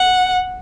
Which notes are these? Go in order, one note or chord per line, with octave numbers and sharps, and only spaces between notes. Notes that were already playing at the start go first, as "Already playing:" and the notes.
Already playing: F#5